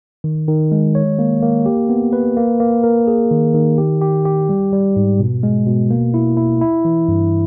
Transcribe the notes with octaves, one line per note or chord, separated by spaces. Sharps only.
D#3
D#3
G#3
C#5
A#3
A#3
G4
B3
B4
A#3
A#3
A#4
G#4
D#3
D#3
G4
G4
G4
G3
G3
G#2
B2
G#3
B2
A#3
E4
E4
E4
E3
G2